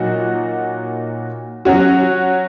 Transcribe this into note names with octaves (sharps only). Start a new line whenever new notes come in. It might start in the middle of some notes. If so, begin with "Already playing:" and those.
Already playing: A#2 F#3 D#4 F#4
F#3 C#4 F#4